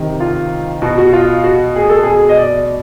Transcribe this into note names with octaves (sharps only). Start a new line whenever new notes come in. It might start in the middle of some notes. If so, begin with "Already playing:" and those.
Already playing: C3 D#3
F4
B2 F#4
F#4
F4
F#4
G#4
A4
B2 G#4
D#5
D5